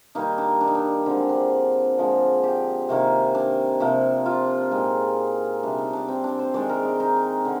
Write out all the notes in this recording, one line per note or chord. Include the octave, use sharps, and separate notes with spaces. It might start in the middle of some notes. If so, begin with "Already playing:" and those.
D#3 G3 A#3 D#4
D4
D4
D#4
D4
D3 F3 G#3 C4
D4
D3 F3 G#3
G4
C3 D#3 A#3
D4
C3 F3 A#3
F4
A#2 G#3 C4 D#4
C3 G3 C4 D4
D#4
D4
C4
D4
C5
D#3 G#3 C4 D5
A#4
D#4
D#4
D3